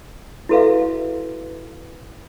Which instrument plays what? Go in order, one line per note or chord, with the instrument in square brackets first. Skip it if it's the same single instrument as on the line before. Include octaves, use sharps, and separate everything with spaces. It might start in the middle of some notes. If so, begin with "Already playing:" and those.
[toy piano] E4 F#4 A4 B4 E5 F5